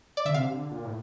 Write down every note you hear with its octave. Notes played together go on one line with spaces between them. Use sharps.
D5
D3 E5
C3 F5
D3
A#2
A2